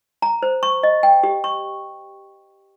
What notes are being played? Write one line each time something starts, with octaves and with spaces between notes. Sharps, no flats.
A#5
C5
C#6
D#5
G5
G4
C#6